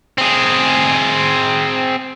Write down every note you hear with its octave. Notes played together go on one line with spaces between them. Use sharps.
C4 G#4